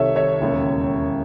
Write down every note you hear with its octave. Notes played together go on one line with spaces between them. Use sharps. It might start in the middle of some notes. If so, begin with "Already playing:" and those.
Already playing: C2 C3 D#3 A4 C#5 E5
C#5 E5
E1 D#2 C#3